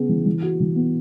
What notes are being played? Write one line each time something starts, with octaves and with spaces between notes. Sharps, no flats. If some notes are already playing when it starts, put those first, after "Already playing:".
Already playing: C#3 B3 G#4
E3
E3
F#4
E3
B3